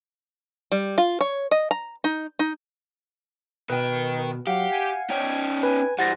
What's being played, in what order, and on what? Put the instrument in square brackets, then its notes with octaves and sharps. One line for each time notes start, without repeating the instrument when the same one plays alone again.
[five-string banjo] G3
F4
C#5
D#5
A#5
D#4
D#4
[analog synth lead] B2 [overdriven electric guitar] D#3 G5 [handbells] B4
[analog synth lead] F#3 [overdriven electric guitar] G4 [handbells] F5 F#5
[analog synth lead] G#5
[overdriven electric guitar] C#4 D#4 [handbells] G5 [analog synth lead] G#6
[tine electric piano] B4 [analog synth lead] G#5
[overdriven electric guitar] E3 G3 [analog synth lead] C5 [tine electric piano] F#5 A6 A#6